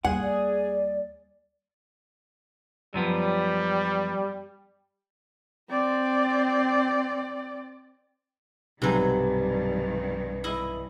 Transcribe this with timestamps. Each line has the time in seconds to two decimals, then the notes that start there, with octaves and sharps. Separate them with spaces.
0.05 D#2 G3 G#4 F#5
0.22 D5
2.94 F#2 F3 G3 B3
5.69 C4 D5
8.82 B1 G2 C3 D#3 F#3 B4 G#5
10.44 E4 D#5